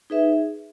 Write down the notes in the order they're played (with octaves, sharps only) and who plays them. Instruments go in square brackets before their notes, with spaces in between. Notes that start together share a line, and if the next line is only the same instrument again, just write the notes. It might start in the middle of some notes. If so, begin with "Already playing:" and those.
[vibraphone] D#4 G#4 B4 E5